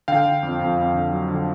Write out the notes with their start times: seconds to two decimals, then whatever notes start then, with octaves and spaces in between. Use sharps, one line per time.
0.08 D3 F5 G5
0.26 D3
0.43 F2
0.59 F2
0.78 F2
0.94 D3
1.11 F#3
1.28 D3